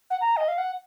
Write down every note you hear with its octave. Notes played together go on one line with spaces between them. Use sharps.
F#5
A#5
D#5
F5
F#5